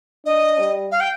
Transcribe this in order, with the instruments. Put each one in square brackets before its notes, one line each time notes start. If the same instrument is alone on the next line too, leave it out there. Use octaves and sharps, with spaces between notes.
[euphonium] D4 [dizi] D#5
[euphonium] G3
[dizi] F5
G5